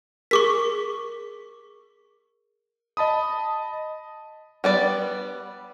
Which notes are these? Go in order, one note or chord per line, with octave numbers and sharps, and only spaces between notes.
G#4 A#4 C#6 D6 B6
D#5 A5 B5 D#6
G3 B3 D5